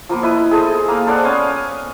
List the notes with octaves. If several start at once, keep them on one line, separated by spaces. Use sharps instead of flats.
F3 A#3 B3
E4 B4 D#5
G#4 A4 C5 D#5
A#3 F5
A4 C5 D5 F#5
B3 C#4 F5 G#5